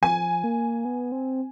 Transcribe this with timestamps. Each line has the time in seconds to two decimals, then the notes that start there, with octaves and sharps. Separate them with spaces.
0.02 F3 G#5
0.44 A#3
0.85 B3
1.12 C4